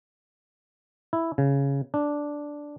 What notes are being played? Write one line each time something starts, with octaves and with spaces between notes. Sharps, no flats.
E4
C#3
D4